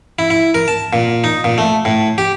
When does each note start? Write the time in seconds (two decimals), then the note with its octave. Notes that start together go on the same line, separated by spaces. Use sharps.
0.19 E4
0.30 E4
0.54 A#4
0.68 A5
0.93 A#2
1.24 D#4
1.44 A#2
1.58 A3
1.85 A2
2.18 G4